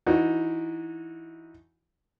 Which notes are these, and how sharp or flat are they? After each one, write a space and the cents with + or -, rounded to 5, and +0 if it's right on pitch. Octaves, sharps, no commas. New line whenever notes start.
E3 +0 D#4 +0 F#4 -20